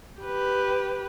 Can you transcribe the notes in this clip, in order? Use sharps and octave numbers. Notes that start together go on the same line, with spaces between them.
G4 B4